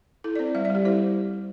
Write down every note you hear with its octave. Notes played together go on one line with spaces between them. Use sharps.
E4 A4
D5
C4 C5
G3 E5
D5
G3 G4
E4 C5